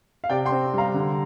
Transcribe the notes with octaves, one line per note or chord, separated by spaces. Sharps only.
F5
C3 D5 G5
G5 C6
C4
G3 F5 A#5
D3